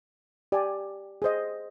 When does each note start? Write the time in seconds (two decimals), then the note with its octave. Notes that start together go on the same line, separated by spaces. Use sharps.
0.52 G4 D5 G#5
1.22 G#4 C5 D#5